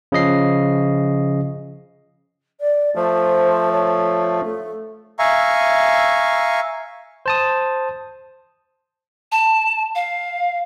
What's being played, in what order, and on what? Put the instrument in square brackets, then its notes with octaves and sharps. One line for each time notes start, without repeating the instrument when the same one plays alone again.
[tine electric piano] C#3 F3 D#5 C7
[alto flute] D5
[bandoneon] F3 A3 [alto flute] C5
[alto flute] C#5
A3
[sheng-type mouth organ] E5 F5 G#5 A#5 C#6
[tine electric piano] C5 A5 D#6
[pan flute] A5
F5